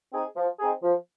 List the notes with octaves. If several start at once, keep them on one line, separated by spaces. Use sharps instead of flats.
C4 D#4 G#4
F3
C4 D#4 G#4
F3